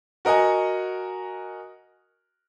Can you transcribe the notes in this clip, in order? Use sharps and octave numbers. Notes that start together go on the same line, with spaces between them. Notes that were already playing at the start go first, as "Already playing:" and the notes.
F#4 A#4 D#5 F#5 G#5